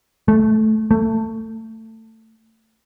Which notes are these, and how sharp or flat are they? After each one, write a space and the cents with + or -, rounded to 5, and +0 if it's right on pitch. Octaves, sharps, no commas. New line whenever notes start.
A3 -15
A3 +20